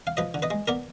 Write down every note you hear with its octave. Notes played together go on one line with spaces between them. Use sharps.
F5
F3 B4 D#5
D3
B4 D#5
G#3
B3 A#4 D5